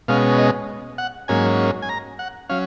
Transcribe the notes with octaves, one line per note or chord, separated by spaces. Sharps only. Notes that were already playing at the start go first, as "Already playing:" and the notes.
B2 G#3 C#4 F5
D#5
F#5
G#2 F#3 A#3 C#4 G#5
G#5
A#5
F#5
F#3 C#4 F5